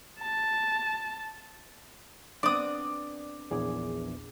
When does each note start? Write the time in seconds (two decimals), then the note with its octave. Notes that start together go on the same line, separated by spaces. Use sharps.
0.21 A5
2.43 B3 C4 D4 D5 D#6
3.51 A#1 E2 G#4 D6